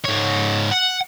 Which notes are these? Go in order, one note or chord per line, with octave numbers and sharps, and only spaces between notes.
G#2 C#5
F#5